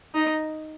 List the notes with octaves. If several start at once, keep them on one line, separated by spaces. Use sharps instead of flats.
D#4